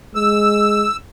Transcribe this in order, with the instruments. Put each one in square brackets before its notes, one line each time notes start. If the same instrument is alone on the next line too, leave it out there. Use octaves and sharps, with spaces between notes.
[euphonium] G#3 [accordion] E6